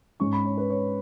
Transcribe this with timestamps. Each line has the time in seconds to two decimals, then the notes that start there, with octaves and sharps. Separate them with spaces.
0.20 G#2 G#3 C#4 C#6
0.33 B5
0.45 C#5
0.58 B4
0.70 C#5